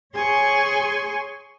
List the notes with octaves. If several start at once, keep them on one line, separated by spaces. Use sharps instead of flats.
G#4 C#5 G#5 C6 C#6